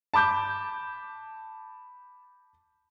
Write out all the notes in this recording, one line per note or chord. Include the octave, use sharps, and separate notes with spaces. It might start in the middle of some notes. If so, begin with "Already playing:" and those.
A5 B5 D6 G6